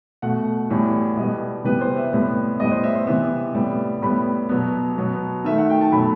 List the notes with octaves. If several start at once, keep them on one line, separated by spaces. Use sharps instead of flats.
B2 A3 F#5
A2 E3 G3 B3
B2 G3 B3 D#5
C3 E3 G3 B3 B4
C5
E5
A2 G3 B3
A2 G3 B3 D#5
C5
E5
C5
C3 E3 B3 E5
A2 G3 B3
A2 G3 B3 B5
B2 F#3 B3
B2 F#3 B3
D#3 A3 E5
F#5
G5
A5
B2 F#3 A3 B5